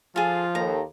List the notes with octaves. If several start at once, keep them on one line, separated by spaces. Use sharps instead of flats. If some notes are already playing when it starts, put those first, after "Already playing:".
F3 F4 G#4 A4
D#2 A4 A#5